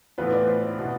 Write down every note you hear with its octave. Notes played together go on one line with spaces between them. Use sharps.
A2 E3 B3 F4 B4
D5
C5
E4
B2 B3 E4